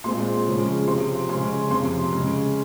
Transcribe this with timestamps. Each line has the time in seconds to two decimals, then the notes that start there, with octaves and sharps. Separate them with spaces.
0.04 A#2 G#3 C4 C6
0.46 C#3 F3 G#3 C#4
0.87 C3 F3 C4 C6
1.29 C#3 G#3 C#4 C6
1.70 F2 C3 F3 C6
2.12 C#3 G#3 C#4